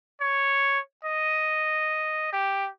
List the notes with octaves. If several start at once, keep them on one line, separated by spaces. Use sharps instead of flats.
C#5
D#5
G4